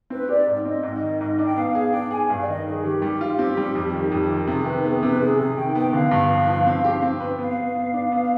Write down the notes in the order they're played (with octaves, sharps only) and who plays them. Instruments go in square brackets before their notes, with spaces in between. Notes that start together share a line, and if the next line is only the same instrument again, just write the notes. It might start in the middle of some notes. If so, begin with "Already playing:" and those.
[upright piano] C4 [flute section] B4
[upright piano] G4 [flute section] D5
[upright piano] G#2
[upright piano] C4 [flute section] D#5
[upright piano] G#2
D#3
G#2
D4
[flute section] G5
[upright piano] B3 [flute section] F5
[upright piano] G#4 [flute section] F5
[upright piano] D4 [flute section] G5
[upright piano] G#4 [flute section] G#5
[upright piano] G2 [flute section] F5
[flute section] D5
[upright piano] D#3 [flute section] D#5
[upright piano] D#3 [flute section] G#4
[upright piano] D#3 [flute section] G4
[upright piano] G3
F4
C4
G3
F2
D#3
F2
D#3
[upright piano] C3 [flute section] G#4
[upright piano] D#3 [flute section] B4
[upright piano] B3 [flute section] G#4
[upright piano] C3 [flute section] B4
[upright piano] C3 [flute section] G#4
[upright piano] C3 [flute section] G#4
[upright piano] D#3 [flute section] G5
[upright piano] B3 [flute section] G5
[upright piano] D3 [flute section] F5
[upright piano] G2
F3
F3
C4
G4
C4
B4
[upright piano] B3 [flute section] F5
[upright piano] B3
B3
D4
B3